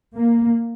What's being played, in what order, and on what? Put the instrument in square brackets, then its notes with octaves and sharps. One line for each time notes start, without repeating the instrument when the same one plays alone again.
[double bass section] A#3